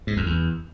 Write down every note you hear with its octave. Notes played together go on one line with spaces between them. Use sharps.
G#2
F2
E2